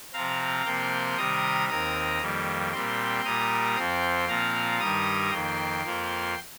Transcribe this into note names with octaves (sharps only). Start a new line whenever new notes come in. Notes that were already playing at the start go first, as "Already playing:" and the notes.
C3 F3 C4 F5 A#5
C3 F3 A#3 G5 C6
C3 D#3 G3 A#5 D#6
D#2 D#3 C4 A#5 D#6
F2 D#3 G3 A#3
A#2 G3 C4 G5 C6
A#2 G3 A#3 A#5 D#6
F2 F3 C4 G5 C6
A#2 F3 C4 F5 A#5
G2 D#3 G3 A#5 D#6
F2 D#3 A#3 G5 C6
F2 F3 A#3